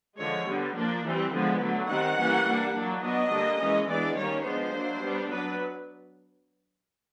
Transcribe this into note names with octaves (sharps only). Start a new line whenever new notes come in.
D3 F3 G#3 C#5
D3 G3 B3
F3 A#3 D4
E3 G3 C4
D3 F3 G#3 B3
D3 F#3 A3
D#3 G3 C4 F#5
E3 G3 A#3 C#4
G3 A#3 D4
F#3 A#3 D4
F#3 B3 D4 D#5
D3 G3 A#3 D4
E3 G#3 C#4
E3 G#3 B3 D4 D5
D#3 G3 A#3 C#4 C#5
F3 G#3 B3 D4 C5
F#3 A#3 D4
G3 B3 D4
F#3 B3 D4 B4